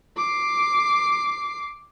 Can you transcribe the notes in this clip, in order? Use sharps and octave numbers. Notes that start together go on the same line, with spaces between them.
D6 C7